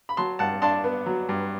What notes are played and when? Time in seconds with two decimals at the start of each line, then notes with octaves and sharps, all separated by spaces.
0.09 B5
0.17 F#3 A5 C6
0.39 G2 F#5 A5
0.62 D4 A5 C6
0.84 B3
1.06 F#3
1.29 G2